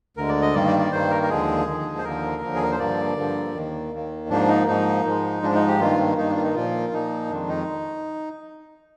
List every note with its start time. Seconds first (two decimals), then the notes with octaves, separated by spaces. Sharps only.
0.17 D2 D3 G#3 A#4
0.29 D5
0.42 D#5
0.54 G2 D#3 G3 A#3 D5
0.67 D5
0.79 D5
0.92 G2 D#3 G3 A#3 C5
1.10 A#4
1.23 A#4
1.30 D#2 D3 F3 G#3 G#4
1.67 D#2 D3 F3 G#3
1.98 C5
2.04 D#2 D3 F3 A#3 A#4
2.42 D#2 D3 F3 A#3
2.55 G#4
2.63 A#4
2.72 C5
2.79 G2 D3 F3 A#3 D5
3.17 G2 D3 F3 A#3
3.55 D#2 D#3 A#3
3.92 D#2 D#3 A#3
4.30 G#2 F3 A#3 D4
4.49 D#4
4.67 G#2 F3 A#3 D#4
5.05 G#2 F3 G#3
5.42 G#2 F3 G#3 D4
5.55 D#4
5.68 G4
5.80 G2 D#3 A#3 F4
6.17 G2 D#3 A#3 D#4
6.30 D4
6.36 F4
6.42 D#4
6.55 A#2 F3 A#3 F4
6.93 A#2 F3 A#3 D#4
7.30 F2 D#3 G#3 D4
7.49 D#4